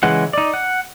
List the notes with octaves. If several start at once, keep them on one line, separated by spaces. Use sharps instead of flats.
C#3 E3 G#3 F#5
D#4 D5
F#5